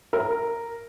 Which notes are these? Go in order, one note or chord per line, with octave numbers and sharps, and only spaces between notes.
A#4